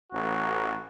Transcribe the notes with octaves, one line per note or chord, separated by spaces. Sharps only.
A1 F#4